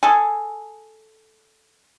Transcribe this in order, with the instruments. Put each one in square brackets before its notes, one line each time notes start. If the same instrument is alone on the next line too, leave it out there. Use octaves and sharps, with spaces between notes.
[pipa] G#4 A4